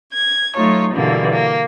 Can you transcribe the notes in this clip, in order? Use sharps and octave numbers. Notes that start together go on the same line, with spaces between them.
G#6
F#3 A3 D#4 F4 C#5
G2 B2 D3 E3 A#3
A#3